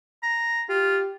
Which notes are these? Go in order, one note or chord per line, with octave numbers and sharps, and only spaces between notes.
A#5
F4 G4